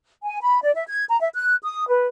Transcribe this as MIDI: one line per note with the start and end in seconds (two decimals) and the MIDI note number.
0.23 0.40 80
0.41 0.59 83
0.62 0.73 74
0.75 0.84 76
0.89 1.03 92
1.08 1.19 82
1.21 1.29 76
1.34 1.56 90
1.63 1.88 87
1.89 2.08 71